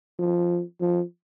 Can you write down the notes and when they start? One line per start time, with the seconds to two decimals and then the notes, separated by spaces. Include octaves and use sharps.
0.19 F3
0.80 F3